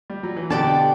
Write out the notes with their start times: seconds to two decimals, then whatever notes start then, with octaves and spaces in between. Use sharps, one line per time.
0.10 G3
0.23 F#3
0.36 E3
0.50 B2 D3 G4 D5 A5